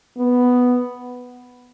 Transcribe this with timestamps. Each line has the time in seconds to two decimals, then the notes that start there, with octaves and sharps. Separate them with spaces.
0.18 B3